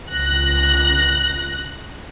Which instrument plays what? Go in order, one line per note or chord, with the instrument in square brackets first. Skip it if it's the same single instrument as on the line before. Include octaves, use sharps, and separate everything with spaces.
[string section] C#2 F#6 A#6